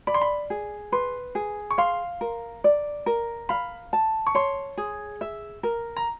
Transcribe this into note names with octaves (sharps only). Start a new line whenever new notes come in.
D5 B5
C6
B5
G#4
B4 C6
G#4
C#6
F5 C6
A#4
D5
A#4
F5 B5
A5
C#6
C#5 C6
G#4
E5
A#4
A#5